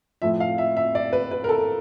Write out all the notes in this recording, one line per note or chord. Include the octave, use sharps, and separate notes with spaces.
A2 F3 E5
F5
E5
E5
D5
B4
B4
A#4
A4